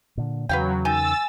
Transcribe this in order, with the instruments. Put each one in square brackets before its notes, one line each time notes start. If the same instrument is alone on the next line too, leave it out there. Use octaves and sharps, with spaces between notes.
[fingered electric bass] A#2 D3
[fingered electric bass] E2 C#3 [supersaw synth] F#3 [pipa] B4 F5 G5
[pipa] D#3 [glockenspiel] G#5 [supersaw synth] E6 A6